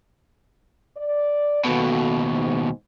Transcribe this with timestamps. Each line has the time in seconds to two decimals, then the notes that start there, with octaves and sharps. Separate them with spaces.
0.97 D5
1.64 D#2 B2 B3 F#4 A4
2.34 G#2